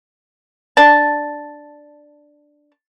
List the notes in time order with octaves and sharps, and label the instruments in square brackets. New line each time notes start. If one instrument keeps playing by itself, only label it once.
[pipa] D4 A5